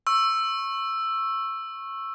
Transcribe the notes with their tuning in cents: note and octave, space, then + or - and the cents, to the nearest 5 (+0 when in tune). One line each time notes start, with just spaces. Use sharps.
C#6 -20 E6 +5